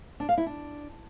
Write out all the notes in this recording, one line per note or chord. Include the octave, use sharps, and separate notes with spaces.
D4
F5
E4
D4